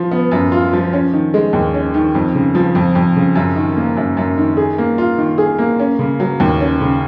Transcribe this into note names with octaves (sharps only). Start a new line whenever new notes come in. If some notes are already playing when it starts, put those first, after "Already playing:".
Already playing: F3 F4
B3
F#2
F4
F3
C#4
D#3
G#3
D#2
C#4
D#3
F2
C#3
F3
F2
F2
C#3
F#2
D#3
A#3
F#2
F#2
D#3
G#4
A#3
F4
D#3
G#4
A#3
C#4
C#3
F#3
D#2
C#4
C#3